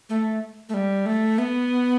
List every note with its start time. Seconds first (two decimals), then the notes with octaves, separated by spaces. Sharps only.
0.09 A3
0.69 A3
0.74 G3
1.06 A3
1.38 B3